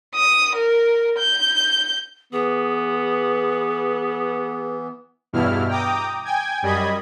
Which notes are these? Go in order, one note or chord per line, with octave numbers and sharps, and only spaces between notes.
D#6
A#4
G6
E3 B3 G#4
E2 G2 B2 E4 F6
G5 A#5 D6 D#6
G5 G#5 G#6
F#2 G3 D#5 B5 G#6